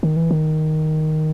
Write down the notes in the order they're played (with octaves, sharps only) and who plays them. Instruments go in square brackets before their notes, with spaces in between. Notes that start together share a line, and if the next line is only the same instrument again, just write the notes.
[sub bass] D#3
E3
D#3